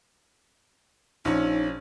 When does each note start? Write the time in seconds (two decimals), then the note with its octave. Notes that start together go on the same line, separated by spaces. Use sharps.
1.25 A#1 C#4 D#4